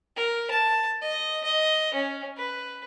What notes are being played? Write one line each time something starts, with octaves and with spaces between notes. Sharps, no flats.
A#4
A5
D#5
D#5
C#4
B4